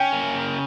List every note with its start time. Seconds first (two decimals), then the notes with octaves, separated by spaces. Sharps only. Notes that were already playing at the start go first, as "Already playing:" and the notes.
Already playing: C#4 G5
0.12 A#3
0.34 C#3